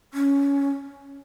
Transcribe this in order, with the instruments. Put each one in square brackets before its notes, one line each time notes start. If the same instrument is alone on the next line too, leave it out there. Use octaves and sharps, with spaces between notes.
[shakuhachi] C#4